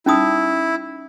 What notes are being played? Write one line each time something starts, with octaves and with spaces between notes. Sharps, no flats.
C#4 D#4 E4 D#6